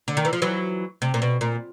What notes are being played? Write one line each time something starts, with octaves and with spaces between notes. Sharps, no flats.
D3
D#3
E3
F3
E3 F#3
C3
A#2
B2
A#2